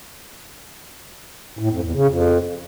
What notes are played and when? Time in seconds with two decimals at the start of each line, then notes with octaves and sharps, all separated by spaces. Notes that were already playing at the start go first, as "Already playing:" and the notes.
1.59 A2
1.71 F2
1.83 E2
1.95 C#3
2.07 F2